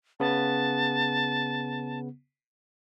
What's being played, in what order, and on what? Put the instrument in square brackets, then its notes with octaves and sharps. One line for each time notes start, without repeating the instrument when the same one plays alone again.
[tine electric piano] C#3 B3 [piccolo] A5